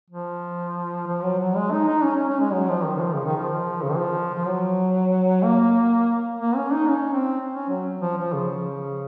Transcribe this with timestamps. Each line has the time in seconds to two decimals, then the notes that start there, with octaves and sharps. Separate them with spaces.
0.10 F3
1.07 F3
1.23 F#3
1.39 F#3
1.56 G#3
1.72 D#4
1.88 D#4
2.03 C#4
2.16 C#4
2.29 C#4
2.40 G#3
2.52 F#3
2.68 F3
2.84 D#3
2.96 D#3
3.00 F3
3.13 C#3
3.25 D#3
3.37 F3
3.82 C#3
3.89 D#3
3.98 F3
4.35 F3
4.46 F#3
5.43 A#3
6.39 A#3
6.56 C#4
6.73 D#4
6.89 C#4
7.13 C4
7.53 C#4
7.69 F#3
8.01 F3
8.17 F3
8.33 C#3